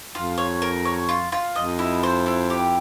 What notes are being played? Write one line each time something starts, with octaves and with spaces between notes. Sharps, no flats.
F2 F4
C#5
A#4
C#5
F4
F4
F2 D#5
E4
C5
E4
G4